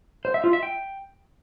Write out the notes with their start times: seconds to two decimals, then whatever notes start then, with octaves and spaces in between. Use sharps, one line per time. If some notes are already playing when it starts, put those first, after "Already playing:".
0.25 C5
0.34 E5
0.44 F4
0.53 E5
0.63 G5